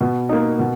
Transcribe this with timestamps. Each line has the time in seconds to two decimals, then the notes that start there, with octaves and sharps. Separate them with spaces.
0.01 B2
0.29 A#3 D#4
0.59 B2